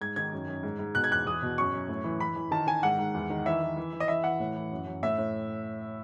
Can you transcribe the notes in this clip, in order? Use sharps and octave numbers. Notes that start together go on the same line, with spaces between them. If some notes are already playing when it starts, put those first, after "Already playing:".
G#2 G#6
D#3 G#6
F#2
F#2
G#2
G#2
B2 F#6
G#6
E2 F#6
E2 D#6
B2
F#2 C#6
F#2
A2
E3
E3 B5
E3
D#3 A5
D#3 G#5
G#2 F#5
G#2
E2
D#3
E3 E5
E3
E3
E3
D#5
E3 E5
E3 F#5
A2
E3
F#2
F#2
A2 E5
A2